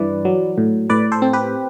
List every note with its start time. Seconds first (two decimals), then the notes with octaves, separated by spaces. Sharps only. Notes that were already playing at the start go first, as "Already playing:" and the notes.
Already playing: G2 E3 B4 D5
0.25 F#3
0.58 A2
0.90 A2 B4 D5
1.12 A4 C5
1.22 C4
1.33 G4 B4